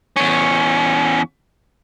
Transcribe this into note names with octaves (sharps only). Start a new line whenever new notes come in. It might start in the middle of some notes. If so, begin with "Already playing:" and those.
E2 C#4